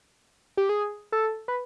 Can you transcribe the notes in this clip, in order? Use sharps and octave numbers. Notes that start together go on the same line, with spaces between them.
G4
G#4
A4
B4